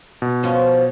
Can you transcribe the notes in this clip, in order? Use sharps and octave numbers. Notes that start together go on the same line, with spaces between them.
B2
F3 C#4 F4